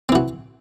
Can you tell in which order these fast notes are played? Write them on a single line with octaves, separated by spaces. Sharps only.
C4 E3 F#4